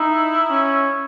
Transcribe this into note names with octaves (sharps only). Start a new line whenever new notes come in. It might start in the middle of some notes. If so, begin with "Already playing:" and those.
Already playing: D#4 E4
C#4